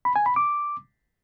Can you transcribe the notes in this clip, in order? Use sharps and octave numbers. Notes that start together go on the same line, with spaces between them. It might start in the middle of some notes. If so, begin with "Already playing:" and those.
B5
G#5
B5
D6